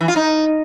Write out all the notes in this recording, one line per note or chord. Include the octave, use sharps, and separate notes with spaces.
E3
F4
D#4